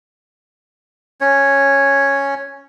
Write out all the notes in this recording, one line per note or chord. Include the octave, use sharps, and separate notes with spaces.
C#4 C#5